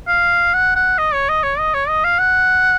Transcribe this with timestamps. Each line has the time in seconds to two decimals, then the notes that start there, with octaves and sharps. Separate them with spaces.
0.08 F5
0.54 F#5
0.76 F#5
0.98 D#5
1.14 C#5
1.29 D#5
1.44 C#5
1.59 D#5
1.74 C#5
1.89 D#5
2.05 F5
2.19 F#5